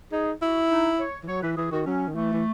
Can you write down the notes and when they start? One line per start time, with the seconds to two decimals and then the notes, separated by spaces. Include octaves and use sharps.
0.12 D#4 G#4
0.41 E4 F#4
0.70 D#4
0.99 C#5
1.23 E3
1.28 F#3 C#5
1.43 E3 B4
1.57 E3 G#4
1.71 D#3 F#4
1.86 F#3 C#4
2.07 D#3
2.14 E3 A3
2.33 E3